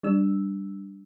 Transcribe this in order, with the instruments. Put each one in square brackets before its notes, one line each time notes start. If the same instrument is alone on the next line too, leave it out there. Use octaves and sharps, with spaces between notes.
[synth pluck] G3 D4 E6